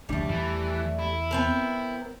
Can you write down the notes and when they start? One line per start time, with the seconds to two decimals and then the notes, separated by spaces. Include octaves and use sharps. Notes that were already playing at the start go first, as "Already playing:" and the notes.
0.09 F1 D2 G3 A3 D4
0.30 E2 E3
0.99 E4
1.31 B3 C4 A#4